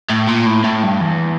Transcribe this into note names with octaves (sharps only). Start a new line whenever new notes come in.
A2
A#2
A2
A2
G2
E2